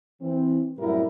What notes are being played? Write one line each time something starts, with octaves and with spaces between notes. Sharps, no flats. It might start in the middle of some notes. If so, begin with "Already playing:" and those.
E3 C4
F#2 A2 C3 G3 E4 A#4